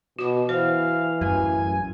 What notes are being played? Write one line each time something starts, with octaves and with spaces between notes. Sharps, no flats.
B2 F#4 D6
E3 C5 F5
A1 F#2 F#3 G#5